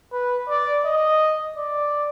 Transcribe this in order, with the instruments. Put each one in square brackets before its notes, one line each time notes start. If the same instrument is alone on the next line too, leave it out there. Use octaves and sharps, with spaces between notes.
[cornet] B4
D5
D#5
D5